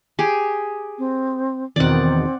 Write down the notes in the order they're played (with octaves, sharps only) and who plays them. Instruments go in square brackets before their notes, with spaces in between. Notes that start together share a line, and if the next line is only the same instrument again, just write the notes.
[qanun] G4 G#4
[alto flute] C4
[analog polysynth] E2 B2 D#3 [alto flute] C4 [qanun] D5 F#5